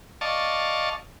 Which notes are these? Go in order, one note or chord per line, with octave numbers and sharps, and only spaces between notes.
D5 D#5 F5 A5 C#6